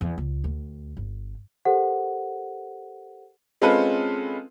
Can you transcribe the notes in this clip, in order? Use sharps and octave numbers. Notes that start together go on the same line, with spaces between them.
E2
C#2
D2
G1
G4 A4 A#4 C5 F#5
G#3 C4 C#4 F4 A4 B4